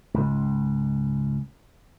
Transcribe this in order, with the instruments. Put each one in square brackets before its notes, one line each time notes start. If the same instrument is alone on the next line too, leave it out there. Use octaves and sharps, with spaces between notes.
[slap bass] C#2 G#2